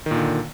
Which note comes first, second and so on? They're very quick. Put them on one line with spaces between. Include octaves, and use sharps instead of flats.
D#3 A#2 D3